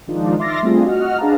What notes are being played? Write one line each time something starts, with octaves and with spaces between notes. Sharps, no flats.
D#3 F3 G#3 D4 D#4 F4
E5 C6 D6 F6 A6 A#6
G3 A3 C4 D4 F4 G#4
F#4 D#5 F#5 F6
D4 G#4 B4 F5 A5 A#5